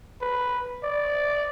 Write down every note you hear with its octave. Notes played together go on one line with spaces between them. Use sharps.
B4
D5